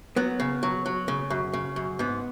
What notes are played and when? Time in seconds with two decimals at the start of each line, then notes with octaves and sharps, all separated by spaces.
0.16 F#3 B3
0.40 C#3
0.63 F#3
0.86 F#3
1.08 C#3
1.30 F#2
1.53 C#3
1.76 F#2
1.99 G#2 B3